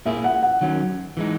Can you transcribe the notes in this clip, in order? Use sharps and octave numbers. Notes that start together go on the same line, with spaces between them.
A#2 A#3 E4 G#4 E5
F#5
F#5
D#3 F#3 C#4
E3 G#3 D#4